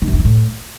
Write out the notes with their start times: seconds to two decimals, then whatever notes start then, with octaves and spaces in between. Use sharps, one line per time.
0.02 D#3
0.08 F#2
0.13 D3
0.19 E3
0.25 A2